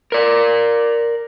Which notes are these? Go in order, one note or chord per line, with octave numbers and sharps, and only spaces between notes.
A#4 D5